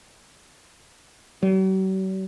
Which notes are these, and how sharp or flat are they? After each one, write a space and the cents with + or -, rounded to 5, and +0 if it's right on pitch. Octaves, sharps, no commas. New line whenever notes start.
F#3 +45